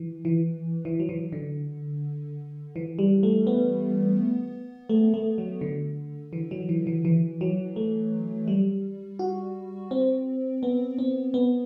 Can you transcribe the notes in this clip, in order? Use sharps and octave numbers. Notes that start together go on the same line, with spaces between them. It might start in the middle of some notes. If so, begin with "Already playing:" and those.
Already playing: E3
E3
E3
F#3
E3
D3
E3
G3
A3
B3
A3
A3
F#3
D3
E3
F#3
E3
E3
E3
F#3
A3
G3
F#4
C4
B3
C4
B3